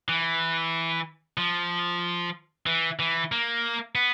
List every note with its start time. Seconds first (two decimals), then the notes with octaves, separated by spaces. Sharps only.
0.09 E3
1.38 F3
2.66 E3
2.99 E3
3.32 A#3
3.95 B3